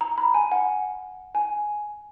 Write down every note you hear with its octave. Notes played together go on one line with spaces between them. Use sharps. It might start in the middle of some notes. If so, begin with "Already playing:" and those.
A#5
B5
G#5
F#5
G#5